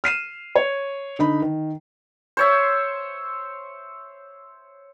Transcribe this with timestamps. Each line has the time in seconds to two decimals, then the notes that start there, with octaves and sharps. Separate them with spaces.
0.04 F6 C7 D#7 E7
0.56 C#5
1.19 D3 D#4 B5
1.42 D#3
2.37 C5 C#5 E5